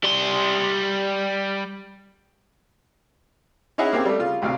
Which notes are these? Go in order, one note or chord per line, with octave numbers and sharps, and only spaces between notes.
G3 C6
C#4 D#4 E4 G#4 F#5
A#3 C4 G4 G#4
G3 A3
C#3 F4
A1 D2 C3 F5